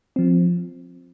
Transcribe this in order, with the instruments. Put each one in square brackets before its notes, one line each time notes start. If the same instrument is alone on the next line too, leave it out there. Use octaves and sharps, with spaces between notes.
[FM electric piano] F3 C4